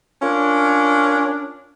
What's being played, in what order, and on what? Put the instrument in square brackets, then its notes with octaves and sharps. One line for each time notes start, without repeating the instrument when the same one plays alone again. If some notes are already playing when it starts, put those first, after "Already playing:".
[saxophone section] C#4 D4 F4 A#4